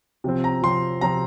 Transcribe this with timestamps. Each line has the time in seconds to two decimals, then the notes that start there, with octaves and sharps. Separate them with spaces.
0.24 C3 F3 C4
0.44 A#5
0.62 C3 F3 C4 C6
1.01 C3 F3 C4 A#5